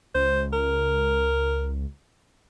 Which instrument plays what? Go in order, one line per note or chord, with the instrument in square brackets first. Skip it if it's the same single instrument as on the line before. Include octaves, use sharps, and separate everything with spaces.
[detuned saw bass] C#2 [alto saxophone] C5
[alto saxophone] A#4